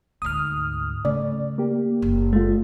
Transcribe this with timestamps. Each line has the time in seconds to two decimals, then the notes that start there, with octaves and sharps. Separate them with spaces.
0.22 D2 G#2 D#6 F6
1.05 C#3 A3 D5
1.58 A#3 G4
2.02 F#1
2.33 G#3 A3 F4